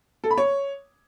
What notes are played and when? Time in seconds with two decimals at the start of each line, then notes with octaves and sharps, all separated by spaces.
0.24 A4
0.31 B5
0.37 C#5